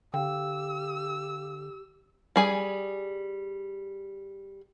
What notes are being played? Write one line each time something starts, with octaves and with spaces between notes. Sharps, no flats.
D3 G4 F5 G5 E6
G3 G#4 G#5